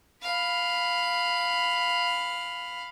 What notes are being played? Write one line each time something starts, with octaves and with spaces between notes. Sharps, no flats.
F5 B5